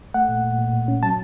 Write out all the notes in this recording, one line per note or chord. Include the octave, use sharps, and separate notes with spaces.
A3 F#5
A#2
A#2
A#2
A#2
C#4
F#3 A5